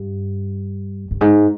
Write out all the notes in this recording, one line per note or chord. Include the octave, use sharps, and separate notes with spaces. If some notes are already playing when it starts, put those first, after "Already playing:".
Already playing: G2
G2
G#2